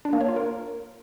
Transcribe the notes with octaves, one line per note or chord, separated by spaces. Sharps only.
D4
A#3
C#5
F4
A#4